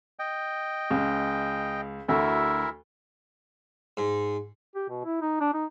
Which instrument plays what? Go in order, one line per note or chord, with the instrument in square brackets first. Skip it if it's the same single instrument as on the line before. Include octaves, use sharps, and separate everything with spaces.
[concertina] D#5 G5
[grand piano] C#2
[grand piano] D2 F#4 [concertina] E4 A#4 E5
[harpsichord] G#2
[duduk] G4
B2
E4
D#4
D4
D#4